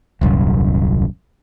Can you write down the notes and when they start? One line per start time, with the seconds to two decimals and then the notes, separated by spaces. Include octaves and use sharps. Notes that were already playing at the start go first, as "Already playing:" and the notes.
0.21 D#1 C2 F#2